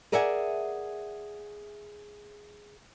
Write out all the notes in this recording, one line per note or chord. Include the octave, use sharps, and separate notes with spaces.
G#4 A#4 D5 E5 F#5 G#5